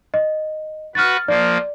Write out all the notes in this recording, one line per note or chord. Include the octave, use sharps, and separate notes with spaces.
D#5
F#4 B4 F6 A6
F3 A#3 D5